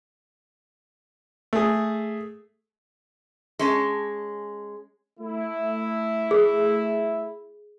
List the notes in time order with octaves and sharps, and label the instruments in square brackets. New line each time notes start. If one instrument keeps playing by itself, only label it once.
[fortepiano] A3 G#4
[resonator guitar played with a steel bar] G#3 C#4 A5
[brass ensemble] A3 E4
[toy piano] G#4